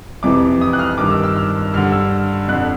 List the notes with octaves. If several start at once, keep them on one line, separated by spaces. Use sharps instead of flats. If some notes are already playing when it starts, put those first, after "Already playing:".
F2 C3 E3 D6
D#6
F#6
F6
G2 D#3 D6
E6
E6
F6
G2 D3 F6
E6
F2 D3 F#6